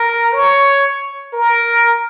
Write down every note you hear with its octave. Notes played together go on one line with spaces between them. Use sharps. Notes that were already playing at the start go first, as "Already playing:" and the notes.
Already playing: A#4
C#5
A#4